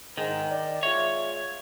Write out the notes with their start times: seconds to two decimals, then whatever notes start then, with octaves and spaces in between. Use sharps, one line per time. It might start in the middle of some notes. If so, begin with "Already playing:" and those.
0.18 G#2 D#3
0.51 D5
0.83 G#3 F4 C#5 E5